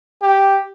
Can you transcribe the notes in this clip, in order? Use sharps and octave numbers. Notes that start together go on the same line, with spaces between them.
G4